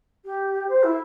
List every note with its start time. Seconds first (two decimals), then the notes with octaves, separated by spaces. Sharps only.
0.25 G4
0.69 C5
0.83 E4